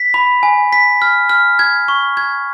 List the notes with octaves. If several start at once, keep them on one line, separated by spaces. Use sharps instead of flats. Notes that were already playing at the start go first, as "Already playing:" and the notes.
Already playing: B6
B5
G#5
B6
F6
F6
G#6
C#6
G#6